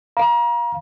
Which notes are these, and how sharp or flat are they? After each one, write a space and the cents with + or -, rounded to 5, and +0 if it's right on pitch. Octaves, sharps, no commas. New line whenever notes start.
F5 +0 A#5 +35